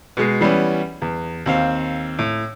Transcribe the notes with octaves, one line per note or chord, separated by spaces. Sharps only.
B2 G#3
E3 G3 B3 C#4
E2
D#2 C4 F5
A2